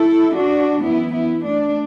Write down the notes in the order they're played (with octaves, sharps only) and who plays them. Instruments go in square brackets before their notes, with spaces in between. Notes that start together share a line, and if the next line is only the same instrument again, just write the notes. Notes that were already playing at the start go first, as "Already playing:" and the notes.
Already playing: [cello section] E4 A4
D4 F#4
F#2 E3 B3 E4
B3 E4
A3 D4